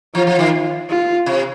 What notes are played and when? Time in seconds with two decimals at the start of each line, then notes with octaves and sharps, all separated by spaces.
0.14 F3 F4
0.27 F3
0.39 D#3
0.89 F4
1.26 C3